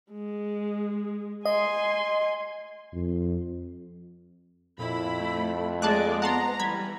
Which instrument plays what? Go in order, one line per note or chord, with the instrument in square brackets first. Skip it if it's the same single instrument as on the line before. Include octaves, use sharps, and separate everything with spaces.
[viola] G#3
[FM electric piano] D#5 [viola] G#5 C6
[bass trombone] F2
[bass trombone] F2 [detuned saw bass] A#2 [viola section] E4 B5
[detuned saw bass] A3
[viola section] G#3 D5 [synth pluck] A5 D6 F#6
[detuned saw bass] B3 [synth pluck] F#5 A5 C6 [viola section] A#5
[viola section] E3 [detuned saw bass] G3 [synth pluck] B5 G#6